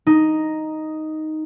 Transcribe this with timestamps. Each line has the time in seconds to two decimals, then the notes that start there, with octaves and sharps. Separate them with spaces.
0.07 D#4